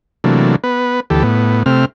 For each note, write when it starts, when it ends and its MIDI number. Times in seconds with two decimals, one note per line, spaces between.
0.24 0.56 48
0.24 0.56 52
0.24 0.56 54
0.24 0.56 57
0.24 0.56 58
0.24 0.56 62
0.64 1.00 59
0.64 1.00 71
1.10 1.23 38
1.10 1.23 52
1.10 1.23 67
1.10 1.23 69
1.23 1.63 45
1.23 1.63 59
1.66 1.85 48
1.66 1.85 57
1.66 1.85 60
1.66 1.85 89